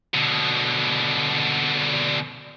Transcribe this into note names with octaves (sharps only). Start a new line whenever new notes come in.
B2 D3